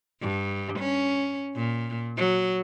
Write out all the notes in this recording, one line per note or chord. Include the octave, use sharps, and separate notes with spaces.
G2
C#4
A#2
F#3